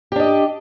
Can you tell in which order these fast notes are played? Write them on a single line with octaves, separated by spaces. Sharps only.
G4 D4 D#5